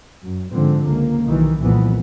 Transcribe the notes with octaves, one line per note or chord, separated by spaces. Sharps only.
F#2
G#2 D3 F3 C4
C#2 A#3
B1 D#3 E3
C2 F2 A#2 E3 B3